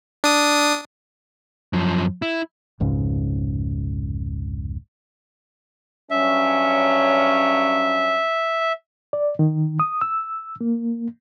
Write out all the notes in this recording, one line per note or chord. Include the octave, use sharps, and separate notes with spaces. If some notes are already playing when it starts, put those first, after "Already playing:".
D4 D#6
F#2 F3
E4
F1 C#2 G#2 C#3
G2 F#3 C#4 E5
D5
D#3
D#6
E6
A#3